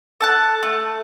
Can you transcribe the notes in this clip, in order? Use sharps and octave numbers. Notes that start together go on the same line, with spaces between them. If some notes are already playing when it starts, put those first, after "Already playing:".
A4 A5 F#6
A3